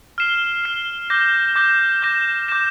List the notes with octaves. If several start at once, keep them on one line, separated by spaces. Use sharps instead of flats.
F6 C7 E7 G7
F6 C7 E7 G7
D6 G6 A#6
D6 G6 A#6
D6 G6 A#6 E7
D6 G6 A#6 E7